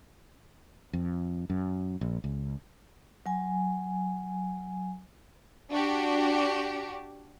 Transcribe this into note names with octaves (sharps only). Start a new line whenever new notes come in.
F2
F#2
A#1
C#2
F#3 G#5
D4 F#4 G4